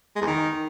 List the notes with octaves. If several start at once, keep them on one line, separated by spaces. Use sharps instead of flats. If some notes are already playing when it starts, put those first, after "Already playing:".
G#3
E2
D#3